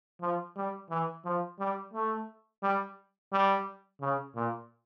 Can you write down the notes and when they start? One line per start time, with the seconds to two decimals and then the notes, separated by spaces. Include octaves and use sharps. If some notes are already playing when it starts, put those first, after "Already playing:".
0.21 F3
0.56 G3
0.90 E3
1.25 F3
1.59 G3
1.94 A3
2.63 G3
3.32 G3
4.01 C#3
4.35 A#2